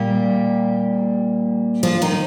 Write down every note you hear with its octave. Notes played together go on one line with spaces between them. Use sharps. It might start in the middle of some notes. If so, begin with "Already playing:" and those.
Already playing: A#2 G3 A#3 G4
F3 F4
D#3 D#4